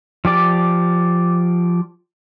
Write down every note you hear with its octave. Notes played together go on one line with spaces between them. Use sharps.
F3 G4 D5